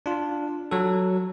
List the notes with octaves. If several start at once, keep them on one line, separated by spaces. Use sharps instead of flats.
D4 F4
F#3 A4